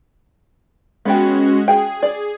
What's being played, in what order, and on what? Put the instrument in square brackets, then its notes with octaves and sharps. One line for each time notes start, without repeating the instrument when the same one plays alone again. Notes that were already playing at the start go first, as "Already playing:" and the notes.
[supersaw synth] G#3 C#4 F#4 [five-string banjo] B3 G5
[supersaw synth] G#4 [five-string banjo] G5
[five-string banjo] D5